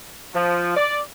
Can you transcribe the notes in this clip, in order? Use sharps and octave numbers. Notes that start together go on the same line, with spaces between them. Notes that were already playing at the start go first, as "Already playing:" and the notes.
F3
D5